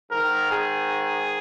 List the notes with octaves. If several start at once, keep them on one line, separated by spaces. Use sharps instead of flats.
G#2 D#3 A#4
G#4